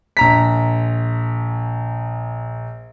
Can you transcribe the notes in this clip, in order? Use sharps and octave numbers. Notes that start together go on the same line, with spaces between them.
A#1 A#5 B6